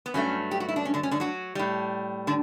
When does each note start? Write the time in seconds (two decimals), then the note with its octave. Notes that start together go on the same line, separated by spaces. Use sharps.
0.06 B3
0.14 G2 F#3 A3 C#4
0.51 G4
0.60 F#4
0.69 E4
0.76 D4
0.85 C#4
0.94 D3 D4
1.03 C#4
1.11 D3 D4
1.20 F#3 F#4
1.55 A2 G3
2.27 D3 D4